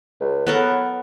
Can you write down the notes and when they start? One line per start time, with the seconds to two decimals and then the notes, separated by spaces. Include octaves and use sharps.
0.20 C#2
0.47 F#3 B3 A4 A#4